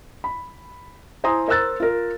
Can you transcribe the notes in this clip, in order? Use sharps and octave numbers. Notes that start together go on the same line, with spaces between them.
B5
E4 C5 G#5 A#5 C6 D#6
A#4 C5 A#5 E6 F#6 A6
F4 A#4